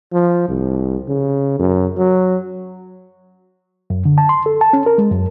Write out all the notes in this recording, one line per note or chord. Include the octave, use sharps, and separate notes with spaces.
F3
C2
C#3
F#2
F#3
F#2
D3
A5
C6
A4
A5
C#4
A#4
G#3
F#2